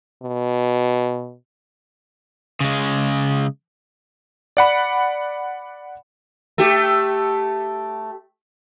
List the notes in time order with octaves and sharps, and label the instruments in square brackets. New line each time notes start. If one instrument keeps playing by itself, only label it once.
[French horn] B2
[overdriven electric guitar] C#3 G#3
[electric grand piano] D5 F#5 B5
[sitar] A3 G4